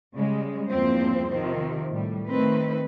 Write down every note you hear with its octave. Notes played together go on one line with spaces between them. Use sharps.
C#3 G3 G#3
E2 G2 F3 A#3 C4 C5
C3 D#3 F3 C4
A2 G3
D#3 A3 C4 B4